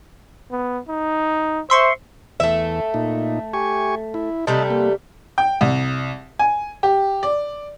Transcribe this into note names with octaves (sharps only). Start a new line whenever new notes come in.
B3
D#4
C5 E5 C6 C#6
E2 A3 E5
A#2 D#4
G4 G#5 C#6
E4
C3 G3 A3 D#5 A5
A#3
G5
C2
G#5
G4
D5